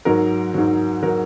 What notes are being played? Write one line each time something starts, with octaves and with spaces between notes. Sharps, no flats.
G#2 F#3 A#4
G#2 F#3
F#3 A#4